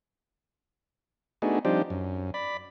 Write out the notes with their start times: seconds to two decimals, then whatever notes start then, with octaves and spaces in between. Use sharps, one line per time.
1.42 A3 B3 D4 D#4 F#4 G#4
1.65 F3 G3 C4 D4 D#4 G4
1.90 F#2
2.34 D5 B5